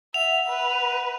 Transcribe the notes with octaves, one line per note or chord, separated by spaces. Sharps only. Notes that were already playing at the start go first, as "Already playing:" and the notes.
E5 F#5 F7
B4